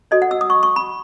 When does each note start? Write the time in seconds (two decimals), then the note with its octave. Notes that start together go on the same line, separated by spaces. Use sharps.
0.11 F#4 A4 C#5 D#5
0.22 F#5
0.31 E6
0.41 D#6
0.50 C#6
0.63 C#6
0.76 B5